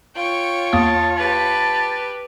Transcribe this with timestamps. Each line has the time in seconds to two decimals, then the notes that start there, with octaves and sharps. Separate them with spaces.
0.15 F4 C#5 G5 C#6
0.73 E2 A#3 A5 D#6
1.17 G4 B4 A5